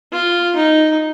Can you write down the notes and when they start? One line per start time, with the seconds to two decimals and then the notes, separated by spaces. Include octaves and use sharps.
0.13 F4
0.56 D#4